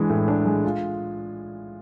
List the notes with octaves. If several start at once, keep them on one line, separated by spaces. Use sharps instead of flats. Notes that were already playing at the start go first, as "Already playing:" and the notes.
Already playing: E3 G#3 D4
A2
D4
G#3
F4